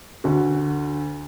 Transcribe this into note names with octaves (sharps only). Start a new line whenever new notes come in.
D2 D3 F#4